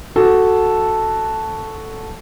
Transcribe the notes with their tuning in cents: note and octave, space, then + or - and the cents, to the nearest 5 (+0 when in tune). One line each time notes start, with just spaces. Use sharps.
F#4 +0 A4 +0